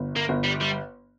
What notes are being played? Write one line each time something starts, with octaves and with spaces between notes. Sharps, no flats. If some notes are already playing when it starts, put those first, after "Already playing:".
Already playing: G1
A#3
G1
G3
G3